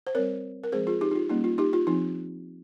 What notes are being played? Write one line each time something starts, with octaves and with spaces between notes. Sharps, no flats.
C5
G3 C4 A#4 C#5
A#4
F3 G#3 C4 G#4 C5
F4 G#4
D#4 G4
D#4
F4
G3 A#3 C#4 D#4
F4
D#4 G4
F4
F3 C4 D#4